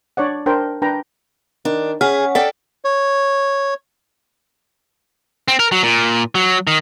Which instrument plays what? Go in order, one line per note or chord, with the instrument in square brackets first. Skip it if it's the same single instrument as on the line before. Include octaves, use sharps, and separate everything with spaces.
[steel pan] D4 C#5 D5 F#5
D4 A#4 C5 G5
D4 B4 G5 A#5
[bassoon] D#3 [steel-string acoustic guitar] D4
[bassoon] C#4 [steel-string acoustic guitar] G#4 [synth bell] F#5 F6
[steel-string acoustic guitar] A4 D5 G5 [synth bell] F#5
[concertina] C#5
[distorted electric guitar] C4
A#4
F#3
A#2
F#3
D#3